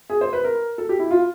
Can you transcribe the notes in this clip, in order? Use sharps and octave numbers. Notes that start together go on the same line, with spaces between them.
G#4
C5
B4
A#4
A4
G4
E4
F4